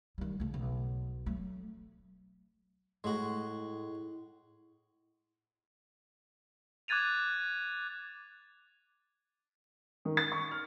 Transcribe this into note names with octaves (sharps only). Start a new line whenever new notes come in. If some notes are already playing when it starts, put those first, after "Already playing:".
D#3 G3
C#3 A3
B1
F#3 A3
A2 G#3 F#4
D6 F#6 G#6 A6 D#7 F7
D#3
A6
C#6
F6